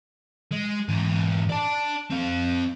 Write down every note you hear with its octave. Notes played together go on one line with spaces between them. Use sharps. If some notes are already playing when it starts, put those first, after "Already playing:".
G#3
G#2 E3
D5 A5
C4 F5